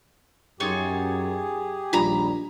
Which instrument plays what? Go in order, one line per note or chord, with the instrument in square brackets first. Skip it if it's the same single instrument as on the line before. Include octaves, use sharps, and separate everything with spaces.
[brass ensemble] F#2 [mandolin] D#4 F4 C#5 [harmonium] G4 G#4
[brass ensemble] A#1 D#2 G3 [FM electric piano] D4 F4 [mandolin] A#5 B5